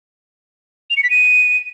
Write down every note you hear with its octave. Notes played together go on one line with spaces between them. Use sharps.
F7
C#7
B6
D#7